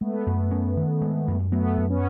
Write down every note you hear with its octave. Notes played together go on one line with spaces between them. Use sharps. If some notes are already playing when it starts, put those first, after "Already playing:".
G#3 A3 B3
F#2
C#4
D#3
G#3
F#2
F#3 A3 B3
F#2
B3 C#4